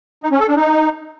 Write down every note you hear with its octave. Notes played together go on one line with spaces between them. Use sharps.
D#4
C#4
A4
D4
D#4